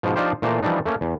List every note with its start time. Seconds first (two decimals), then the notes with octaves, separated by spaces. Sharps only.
0.03 G#2 B2 F3
0.16 F3 D4 D#4 F4 G4 C5
0.42 A#2 E3 A3 C5 D5 A#5
0.62 E3 F3 G3 D4 D#4
0.86 A3 A#3 C#4
1.01 E2